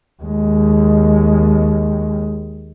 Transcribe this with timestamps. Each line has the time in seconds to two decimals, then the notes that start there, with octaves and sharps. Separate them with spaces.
0.22 D#2 G#3